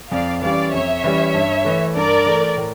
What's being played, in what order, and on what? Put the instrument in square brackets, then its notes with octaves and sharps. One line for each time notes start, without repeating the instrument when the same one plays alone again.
[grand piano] F2 [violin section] D5 F5
[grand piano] E3 G3 C#4 [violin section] D5 F5
[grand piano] F2 [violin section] C#5 E5
[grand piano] E3 G3 C#4
G2
E3 A3
[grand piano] G2 [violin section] A#4 D5
[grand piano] E3 A3
A2